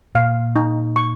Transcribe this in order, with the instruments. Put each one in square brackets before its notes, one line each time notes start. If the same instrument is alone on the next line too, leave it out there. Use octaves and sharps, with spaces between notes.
[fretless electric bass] A#2 [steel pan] F5
[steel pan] D#4
C#6